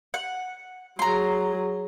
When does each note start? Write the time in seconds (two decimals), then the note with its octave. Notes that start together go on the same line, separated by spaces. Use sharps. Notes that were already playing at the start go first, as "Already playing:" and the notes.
0.14 F#5
0.99 F#3 G#4 A#5 C6